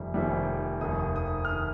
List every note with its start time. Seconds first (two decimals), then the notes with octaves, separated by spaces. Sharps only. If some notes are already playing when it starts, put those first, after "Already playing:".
Already playing: F1 F2 D#3 G3
0.14 F1 F2 D#3 G3
0.81 F1 D#2 D#3 D#6
0.99 D#6
1.16 D#6
1.45 F6
1.49 D#3 D#6